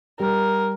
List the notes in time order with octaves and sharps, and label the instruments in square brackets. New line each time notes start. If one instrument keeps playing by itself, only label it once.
[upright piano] G3 [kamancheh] A#4